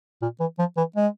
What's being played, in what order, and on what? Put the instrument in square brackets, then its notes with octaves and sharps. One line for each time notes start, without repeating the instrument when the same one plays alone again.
[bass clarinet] A#2
E3
F3
E3
G#3